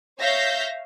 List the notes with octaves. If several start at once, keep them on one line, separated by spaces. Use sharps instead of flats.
C#5 E5 F5 G6 A#6